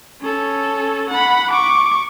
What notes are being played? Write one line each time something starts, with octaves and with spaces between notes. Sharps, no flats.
C#4 A4
F#5 B5
C#6 D6